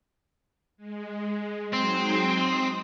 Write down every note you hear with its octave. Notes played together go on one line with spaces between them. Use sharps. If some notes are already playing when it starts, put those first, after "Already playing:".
G#3
F#3 G#3 C4 D#4
D#6